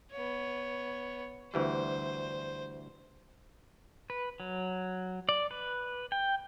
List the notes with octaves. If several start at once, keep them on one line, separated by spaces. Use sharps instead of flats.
B3 C#5
D2 E3 G3 C5
B4
F#3
D5
B4
G5